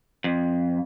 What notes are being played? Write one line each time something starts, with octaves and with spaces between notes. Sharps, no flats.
F2